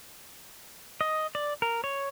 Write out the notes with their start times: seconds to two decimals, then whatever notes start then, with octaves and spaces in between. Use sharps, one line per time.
1.01 D#5
1.35 D5
1.62 A#4
1.84 C#5